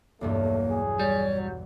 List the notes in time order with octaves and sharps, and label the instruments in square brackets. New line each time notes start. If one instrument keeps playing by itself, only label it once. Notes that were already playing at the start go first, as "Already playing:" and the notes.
[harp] B1 E2 G2 [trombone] A3 [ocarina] A#3
[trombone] G#4
[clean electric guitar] G3 [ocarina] C#5
[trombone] F#3